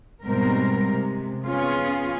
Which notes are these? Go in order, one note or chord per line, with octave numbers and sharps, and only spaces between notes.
G#2 B2 G3 G#3 C4 A#4
C3 G#3
B3 C#4 F4 G#4